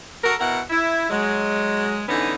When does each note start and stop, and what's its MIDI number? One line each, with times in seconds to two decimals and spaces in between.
0.22 0.34 66
0.22 0.34 69
0.22 0.34 70
0.38 0.60 47
0.38 0.60 64
0.38 0.60 70
0.38 0.60 78
0.70 1.07 64
1.10 2.01 54
1.10 2.01 56
2.07 2.34 50
2.07 2.34 52
2.07 2.34 59
2.07 2.34 61
2.07 2.34 63